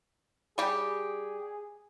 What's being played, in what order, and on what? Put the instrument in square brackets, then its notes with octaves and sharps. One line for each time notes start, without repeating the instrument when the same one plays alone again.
[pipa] G3 G4 [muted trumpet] G#4